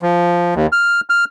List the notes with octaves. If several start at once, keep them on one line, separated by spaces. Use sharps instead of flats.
F3
D#2
F6
F6